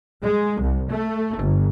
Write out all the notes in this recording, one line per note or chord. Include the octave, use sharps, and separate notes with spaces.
G#3
C2
A3
G1